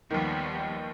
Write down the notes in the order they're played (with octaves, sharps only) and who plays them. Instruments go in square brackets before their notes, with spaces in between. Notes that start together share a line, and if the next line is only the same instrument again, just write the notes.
[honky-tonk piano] D#2 D#3 [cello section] F3 G3 B3